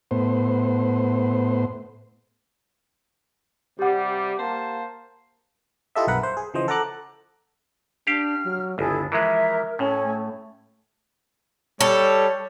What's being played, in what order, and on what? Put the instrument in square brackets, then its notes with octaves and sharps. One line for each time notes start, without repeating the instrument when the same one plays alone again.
[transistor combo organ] A2 B3 C5
[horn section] C3 G3 [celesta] G4 F#5
[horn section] A#3 C5 A5
[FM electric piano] E4 F4 G4 A4 D#5 E5
B1 G2 A#4 B4 F#5 B5
C5
G#4
C#3 E3 F3 C5 D#5
A4 F#5 A#5 D6 F#6
[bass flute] D4 [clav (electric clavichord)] G4 F5 [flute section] F6
[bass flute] F#3
[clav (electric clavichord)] G1 C#2 [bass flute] E4 [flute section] G#4 A4
[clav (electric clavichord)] E3 F3 G#3 [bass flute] A#4 [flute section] E5 A#5
[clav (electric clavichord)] A2 [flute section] C#4 A4
[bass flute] A3
[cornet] G3 [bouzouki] A4 [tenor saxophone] C#5